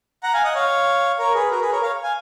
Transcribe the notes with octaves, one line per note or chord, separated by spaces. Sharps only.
F#5 A#5
F5 G#5
D#5 F#5
C#5 F5
A#4 C#5
G#4 B4
F#4 A#4
G#4 B4
A#4 C#5
C#5 F5
F5 G#5